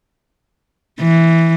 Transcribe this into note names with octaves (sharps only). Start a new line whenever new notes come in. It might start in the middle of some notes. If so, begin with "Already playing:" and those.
E3